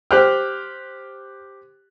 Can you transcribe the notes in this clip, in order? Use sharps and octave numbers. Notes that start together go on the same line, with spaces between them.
G4 C5 G5 F6 F#6